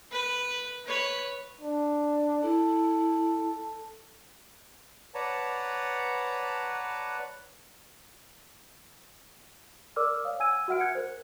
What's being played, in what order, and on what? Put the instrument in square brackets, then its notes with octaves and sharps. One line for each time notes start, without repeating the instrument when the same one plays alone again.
[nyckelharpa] B4
B4 C#5
[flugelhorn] D4
[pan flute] E4 [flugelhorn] A4
[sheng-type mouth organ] B4 C#5 D5 F#5 A5 A#5
[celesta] A#4 D5 D6 E6 F6
C#5 F5 D#6
F#5 G#5 E6 G#6 D#7
F#4 E5 F#5 F6 D7
G#5 F#6 G#6 C#7
A#4 C5